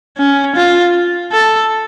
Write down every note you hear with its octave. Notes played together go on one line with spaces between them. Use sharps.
C#4
F4
A4